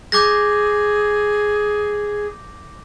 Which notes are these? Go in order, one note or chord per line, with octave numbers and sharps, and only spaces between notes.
G#4 D6 G6 A#6